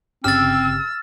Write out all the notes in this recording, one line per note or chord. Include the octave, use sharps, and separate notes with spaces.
G1 C#3 C4 G4 E6 F6 A6